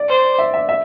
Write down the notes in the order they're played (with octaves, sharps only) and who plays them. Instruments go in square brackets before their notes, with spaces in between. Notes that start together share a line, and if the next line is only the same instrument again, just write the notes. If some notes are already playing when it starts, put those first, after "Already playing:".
Already playing: [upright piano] D5
[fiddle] C5
[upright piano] E5
E5
E5